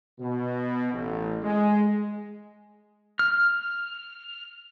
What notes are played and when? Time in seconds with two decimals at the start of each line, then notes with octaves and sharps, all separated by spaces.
0.19 B2
0.93 A1
1.43 G#3
3.19 F6